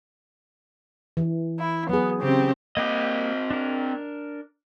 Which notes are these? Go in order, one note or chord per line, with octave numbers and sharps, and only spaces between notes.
E3
E4
F#3 B3 G#4
C#3 C4 G4
A#3 C4 G4 D#5
D4 A#4